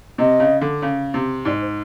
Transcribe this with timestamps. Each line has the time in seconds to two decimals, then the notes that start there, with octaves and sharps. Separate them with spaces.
0.18 C3 D#5
0.40 C#3
0.61 D3
0.82 C#3
1.14 C3
1.45 G#2 D5
1.62 C5